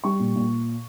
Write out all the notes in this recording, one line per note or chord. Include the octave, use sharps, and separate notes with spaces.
G3 C#6
A#2
A#2